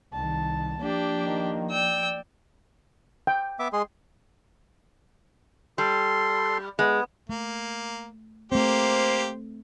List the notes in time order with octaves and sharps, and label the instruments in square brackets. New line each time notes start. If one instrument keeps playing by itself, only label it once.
[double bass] C2 D#3 [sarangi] A5
[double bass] F3 A#3 [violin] D4 G4
[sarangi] D#3
[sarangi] D5 [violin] G5 E6
[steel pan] G5
[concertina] B3 E5 D6
G#3 G#4 C6
[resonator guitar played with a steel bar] G3 [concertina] A4 C6
[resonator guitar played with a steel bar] G#3 [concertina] B3
[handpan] A3 [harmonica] A#3
[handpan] A3 C4 [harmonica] A#3 G4 [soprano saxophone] C5